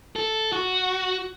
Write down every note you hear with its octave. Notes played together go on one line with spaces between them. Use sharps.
A4
F#4